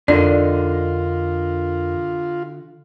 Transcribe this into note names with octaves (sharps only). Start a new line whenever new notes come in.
F2 D3 D#4 F4 A#4 D5